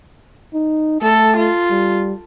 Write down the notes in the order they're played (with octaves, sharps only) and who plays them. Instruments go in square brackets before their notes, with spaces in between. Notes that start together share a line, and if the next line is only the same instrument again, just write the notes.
[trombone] D#4
[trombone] A3 [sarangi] A4
[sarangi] F4
[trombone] G3